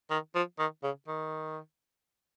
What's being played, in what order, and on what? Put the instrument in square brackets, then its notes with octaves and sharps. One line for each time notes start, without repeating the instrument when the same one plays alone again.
[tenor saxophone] D#3
F3
D#3
C#3
D#3